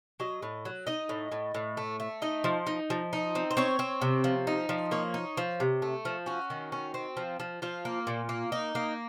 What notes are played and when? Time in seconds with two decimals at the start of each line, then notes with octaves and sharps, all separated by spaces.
0.20 F#3 D#5
0.43 A2
0.65 F#3
0.87 D#4 D#5
1.09 A2
1.32 A2
1.55 A2
1.77 A3
2.00 A3
2.22 D#4 D#5
2.44 F3
2.67 D#4
2.90 F3
3.13 D#4
3.35 C4
3.51 C5
3.57 C4 C#5
3.79 C4
4.02 C3
4.24 F3
4.47 D#4
4.69 F3
4.91 A#3 C#5
5.14 D#4
5.37 F3
5.60 C3
5.82 A3
6.05 F3
6.26 C#4 F#4
6.50 D#3
6.72 C#4
6.94 C4
7.17 F3
7.40 F3
7.62 F3 F4
7.85 A#3
8.07 A#2
8.29 A#3
8.52 D#4
8.75 A#3